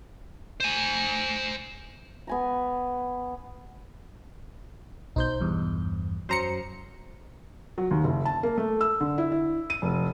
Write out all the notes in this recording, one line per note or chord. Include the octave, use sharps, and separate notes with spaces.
C5 G#5
B3 G#5 A#5
B1 D#4 C5 G6
E2 G2
F#2 F#3 C5 A#5 C6 C#7
F#3
D#2
F#1
A5
A#3
A3
E6
D3
E4
E4
D#7
F1